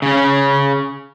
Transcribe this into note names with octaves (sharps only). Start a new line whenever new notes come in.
C#3 C#4